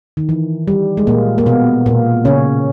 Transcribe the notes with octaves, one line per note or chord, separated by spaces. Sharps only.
D#3
E3
G3
G#3
A#2 A#3
A#3
B2 B3
A#2 A#3
C#3 C#4